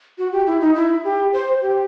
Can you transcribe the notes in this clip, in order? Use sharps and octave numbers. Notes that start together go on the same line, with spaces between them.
F#4
G4
E4
D#4
E4
G4
C5
G4